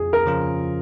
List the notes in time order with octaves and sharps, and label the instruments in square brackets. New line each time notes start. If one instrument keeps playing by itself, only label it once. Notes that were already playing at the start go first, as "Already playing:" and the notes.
Already playing: [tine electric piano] F2 [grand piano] G#4
[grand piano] A#4
[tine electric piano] C#3 F3 C#4 F4